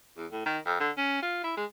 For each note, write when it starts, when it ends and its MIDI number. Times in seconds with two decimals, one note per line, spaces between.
0.17 0.26 40
0.31 0.42 45
0.46 0.58 51
0.66 0.77 41
0.80 0.91 50
0.97 1.22 61
1.22 1.42 65
1.44 1.53 64
1.57 1.65 56